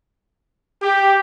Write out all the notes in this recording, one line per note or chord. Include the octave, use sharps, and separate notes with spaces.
G4